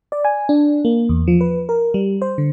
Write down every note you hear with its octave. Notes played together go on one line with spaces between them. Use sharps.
D5
G#5
D4
A#3
E2
F3
B4
A#4
G3
C5
D3